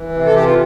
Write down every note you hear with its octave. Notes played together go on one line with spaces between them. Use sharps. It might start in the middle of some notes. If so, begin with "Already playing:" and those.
Already playing: E3
C3
A4
E3 G4
F4